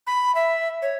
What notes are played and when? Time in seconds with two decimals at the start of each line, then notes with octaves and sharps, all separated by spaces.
0.07 B5
0.35 E5
0.82 C#5